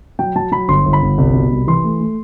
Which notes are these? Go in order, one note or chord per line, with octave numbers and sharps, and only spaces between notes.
F#3 G5
F#3 A5
F#3 B5
G1 C6
G1
B5
G1
C2
B2
C2
E3 C6
A3
A3